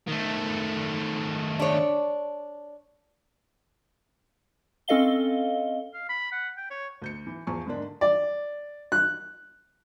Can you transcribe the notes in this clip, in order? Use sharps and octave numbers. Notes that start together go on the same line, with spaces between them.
D#3 A3
D4 C#5
C4 C#4 A4 D#5 F5 G7
F5
B5
F#5
G5
C#5
D2 G6 C#7
E3
E2 F3 G#5 C#6
G#2 D3 A#3 D4
D5
F#6